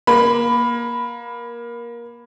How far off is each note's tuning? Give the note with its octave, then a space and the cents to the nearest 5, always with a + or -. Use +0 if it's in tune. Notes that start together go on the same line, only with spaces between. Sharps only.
A#3 +20 B5 +5